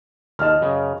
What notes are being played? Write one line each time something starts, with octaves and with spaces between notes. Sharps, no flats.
D#2 D#5 A5 F6
F#2 C#3